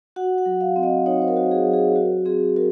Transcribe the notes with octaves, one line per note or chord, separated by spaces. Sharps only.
F#4 F#5
F#5
F#3
F5
C4
D#5
D#4 C#5
C5
A#4
F#4
G#4
F#3
G#4
F#4
C4 G#4
F#4 A#4